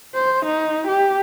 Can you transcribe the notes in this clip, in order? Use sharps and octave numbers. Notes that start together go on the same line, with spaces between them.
C5
D#4
G4